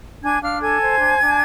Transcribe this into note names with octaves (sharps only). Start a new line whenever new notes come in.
D4 G#5 G#6
D4 F5 F6
A4 G#5 G#6
C5
D4
D4